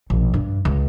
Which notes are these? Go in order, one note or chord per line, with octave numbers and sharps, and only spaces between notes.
A#1 B2
G2
C#2